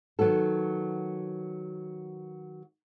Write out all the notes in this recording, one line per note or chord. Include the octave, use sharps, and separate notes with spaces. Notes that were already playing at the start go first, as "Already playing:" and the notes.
D#3 F#3 B3 F#4 A4